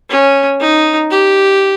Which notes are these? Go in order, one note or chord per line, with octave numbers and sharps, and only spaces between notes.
C#4
D#4
G4